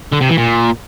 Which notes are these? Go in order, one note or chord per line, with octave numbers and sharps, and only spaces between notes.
D3
C3
E3
A#2